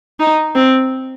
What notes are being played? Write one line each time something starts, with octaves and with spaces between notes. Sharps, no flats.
D#4
C4